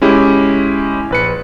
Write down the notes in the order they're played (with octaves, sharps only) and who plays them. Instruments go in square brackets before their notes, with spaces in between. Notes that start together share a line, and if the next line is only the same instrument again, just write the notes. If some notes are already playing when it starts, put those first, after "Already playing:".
[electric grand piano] G#3 C#4 E4 G4
A#1 B4 C#7